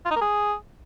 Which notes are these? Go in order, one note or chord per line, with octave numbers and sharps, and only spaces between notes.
F4
D#4
A#4
G#4